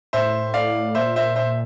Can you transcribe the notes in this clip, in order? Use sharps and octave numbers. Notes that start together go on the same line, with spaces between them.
A2 C5 E5
D5 F5
A#2 C5 E5
C5 E5
C5 E5